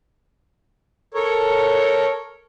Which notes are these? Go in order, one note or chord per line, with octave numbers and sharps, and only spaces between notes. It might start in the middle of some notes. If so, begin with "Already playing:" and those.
A4 A#4 C#5